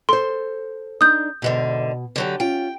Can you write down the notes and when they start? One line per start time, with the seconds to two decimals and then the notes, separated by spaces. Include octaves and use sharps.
0.09 A4 C5 C6
1.01 D4 D#4 D#6 G6
1.42 E2 G#2 B2 D3
2.16 D3 F#3 G4
2.40 C#4 F4 G5